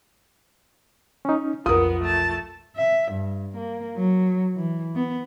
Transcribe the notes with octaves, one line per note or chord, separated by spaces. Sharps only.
C#4 D#4
B1 F2 B3 F4 A#4 D#6
A3 A5
E5
G2
A#3
F#3
E3
B3